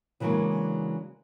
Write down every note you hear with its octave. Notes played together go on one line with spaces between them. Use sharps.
C#3 E3 F#3 G#3 A#3 D4